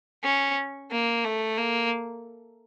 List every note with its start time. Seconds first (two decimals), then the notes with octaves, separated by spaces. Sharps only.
0.23 C#4
0.91 A#3
1.25 A3
1.58 A#3